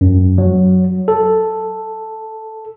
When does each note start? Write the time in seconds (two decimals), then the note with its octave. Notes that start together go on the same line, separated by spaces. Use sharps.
0.01 F#2
0.38 F#3
1.08 A4